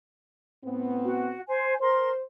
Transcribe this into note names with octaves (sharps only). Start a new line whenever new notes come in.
A2 B3 C4
F#4
C5 G#5
A#4 C5 C6